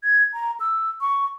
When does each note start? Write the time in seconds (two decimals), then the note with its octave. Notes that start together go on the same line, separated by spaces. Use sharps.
0.03 G#6
0.34 A#5
0.60 E6
1.01 C#6